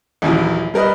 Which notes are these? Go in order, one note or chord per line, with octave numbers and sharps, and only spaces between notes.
A#1 D#2 E3 F#3
G3 A#4 B4 D#5